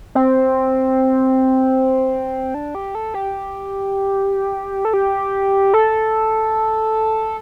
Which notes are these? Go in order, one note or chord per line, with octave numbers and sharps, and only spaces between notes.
C4
D4
G4
A4
G4
A4
G4
A4